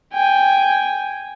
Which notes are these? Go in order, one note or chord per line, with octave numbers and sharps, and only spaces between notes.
G5 G#5